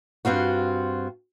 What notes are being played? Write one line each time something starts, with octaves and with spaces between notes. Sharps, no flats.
G2 C4 F4 F#4